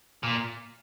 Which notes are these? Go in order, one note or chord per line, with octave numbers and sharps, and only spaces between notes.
A#2